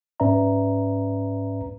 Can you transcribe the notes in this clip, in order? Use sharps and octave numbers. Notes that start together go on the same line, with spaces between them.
G#2 C#4 B4 D5 E5 A#5